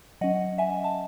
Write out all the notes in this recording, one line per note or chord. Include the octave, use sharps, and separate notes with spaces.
F#3 C#4 D#5 F#5
E5 G#5
A5